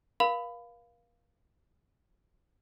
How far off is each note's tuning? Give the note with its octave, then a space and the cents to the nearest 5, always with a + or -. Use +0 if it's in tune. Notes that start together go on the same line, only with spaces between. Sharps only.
A#4 +45 F5 +0 B5 +20